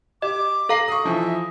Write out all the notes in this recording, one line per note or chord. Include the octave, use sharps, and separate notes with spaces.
G4 D#5 D6
A4 F5 A#5 A#6 C7 F#7
C#6 D#6
E3 F3 D#4 E5